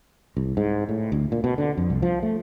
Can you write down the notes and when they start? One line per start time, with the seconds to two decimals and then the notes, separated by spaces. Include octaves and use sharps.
0.37 C2
0.57 G#2
0.89 A2
1.12 D2
1.32 A#2
1.44 B2
1.58 D3
1.77 F2
1.90 C2
2.02 F3
2.23 A3